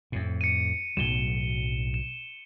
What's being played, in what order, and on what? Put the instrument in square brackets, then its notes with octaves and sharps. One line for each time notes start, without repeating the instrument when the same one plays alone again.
[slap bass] F2 A2
[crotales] C#7 D#7
[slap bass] B1 A2 F#3 [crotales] E7 G7
[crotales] E7